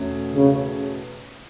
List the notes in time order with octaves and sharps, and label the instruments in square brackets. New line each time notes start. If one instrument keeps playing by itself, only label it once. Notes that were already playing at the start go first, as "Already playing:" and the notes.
Already playing: [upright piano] E2 B2 A3 C#4
[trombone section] C#3